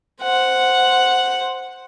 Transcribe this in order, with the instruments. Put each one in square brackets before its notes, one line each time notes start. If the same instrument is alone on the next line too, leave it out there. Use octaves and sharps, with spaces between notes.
[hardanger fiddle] C5 F#5